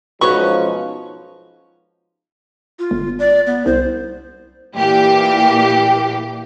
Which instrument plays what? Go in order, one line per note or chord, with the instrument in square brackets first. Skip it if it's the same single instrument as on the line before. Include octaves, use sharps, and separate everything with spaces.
[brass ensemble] B1 G#2 F3 [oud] C#4 F#4 B4 [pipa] C#6
[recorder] F4
[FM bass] G1
[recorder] D5
B3
[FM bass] C2 [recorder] C5
[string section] A#2 E3 G4